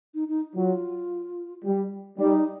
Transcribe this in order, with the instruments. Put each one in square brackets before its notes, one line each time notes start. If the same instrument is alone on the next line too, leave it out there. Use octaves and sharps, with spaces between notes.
[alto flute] D#4
D#4
[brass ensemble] F#3 [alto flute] F4
[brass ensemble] G3
[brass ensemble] G3 [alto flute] D#4